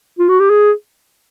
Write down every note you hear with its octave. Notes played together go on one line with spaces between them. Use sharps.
F4
F#4
G4
G#4